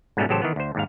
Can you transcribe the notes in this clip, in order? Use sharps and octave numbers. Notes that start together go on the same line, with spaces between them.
G#2 B2 G3 A3 B3 C#4
A1 C#3 F#3 G4 A4 C5
D#3 E3 B3
D2 C5
D#2 G#2 F5